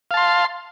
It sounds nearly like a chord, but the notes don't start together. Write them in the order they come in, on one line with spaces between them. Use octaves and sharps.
F5 A5 C6